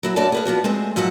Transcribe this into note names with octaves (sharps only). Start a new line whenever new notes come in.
F#3 E4 F#4
F#2 A3 D4 F#4 D5 A5
G#4 B4 F5
F3 B3 D4 F#4
G#3 A3 C4 G#4
G#2 F3 F#3 A4 F#5